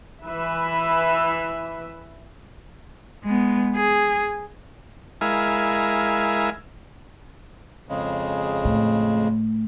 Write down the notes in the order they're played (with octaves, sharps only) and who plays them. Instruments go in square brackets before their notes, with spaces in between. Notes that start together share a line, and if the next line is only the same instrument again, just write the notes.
[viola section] E3 B4 E5
[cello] G#3 B3
G#4
[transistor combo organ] G#3 E4 A#4 E5 F5 G#5
[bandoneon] F2 C#3 G#3
[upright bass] A2